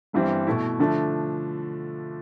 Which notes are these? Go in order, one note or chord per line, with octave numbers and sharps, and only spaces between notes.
G1 G2 E3 G3 C4
B2 A3 E4
D3 F3 A3 D4